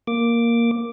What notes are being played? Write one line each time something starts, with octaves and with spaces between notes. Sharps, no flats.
A#3 D6